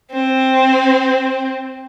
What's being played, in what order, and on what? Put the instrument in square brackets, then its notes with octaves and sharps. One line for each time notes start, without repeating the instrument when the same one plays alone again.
[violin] C4